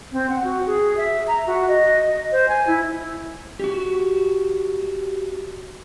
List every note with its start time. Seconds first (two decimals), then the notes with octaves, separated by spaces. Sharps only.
0.12 C4
0.30 F#5
0.44 F#4
0.66 G#4
0.97 E5
1.28 A#5
1.47 F#4
1.68 D#5
2.32 C5
2.49 G#5
2.67 E4
3.60 F#4 G4